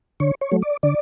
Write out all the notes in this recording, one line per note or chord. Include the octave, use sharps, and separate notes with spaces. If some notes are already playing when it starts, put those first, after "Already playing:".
D3 C#5
C#5
F#3 A3
D5
D3 D5